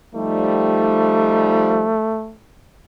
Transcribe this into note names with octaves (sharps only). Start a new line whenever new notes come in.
F3 G3 A3 D#4